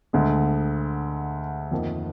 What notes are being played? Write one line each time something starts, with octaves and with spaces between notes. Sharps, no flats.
D2 D3 G#3
F2 D#3 A#3